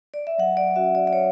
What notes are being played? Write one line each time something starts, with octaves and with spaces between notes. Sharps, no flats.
D5
E5
F#3 F#5
D5
C#4 F#4 E5
D5
D5
F#3 C#5